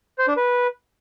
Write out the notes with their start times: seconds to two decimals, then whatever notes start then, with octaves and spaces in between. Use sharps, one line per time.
0.18 C5
0.28 D4
0.37 B4